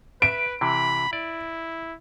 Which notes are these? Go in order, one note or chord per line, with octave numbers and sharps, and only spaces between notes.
B4 E5 D7
C3 E3 B5
E4 D5